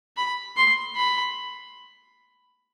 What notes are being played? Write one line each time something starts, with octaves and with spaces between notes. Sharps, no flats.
B5
C6
B5